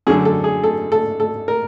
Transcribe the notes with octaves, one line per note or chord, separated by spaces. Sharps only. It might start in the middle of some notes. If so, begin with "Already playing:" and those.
F#2 D3 G#4
A4
G#4
A4
A4
A4
A#4